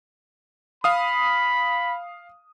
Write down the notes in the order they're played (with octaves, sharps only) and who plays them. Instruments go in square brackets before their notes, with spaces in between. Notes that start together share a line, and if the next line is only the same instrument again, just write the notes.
[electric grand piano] F5 D#6 [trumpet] B5